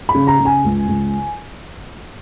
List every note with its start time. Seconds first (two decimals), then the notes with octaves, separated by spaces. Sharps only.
0.09 B5
0.15 C#3
0.27 A#5
0.39 C#3
0.45 G#5
0.65 C#2
0.88 C#2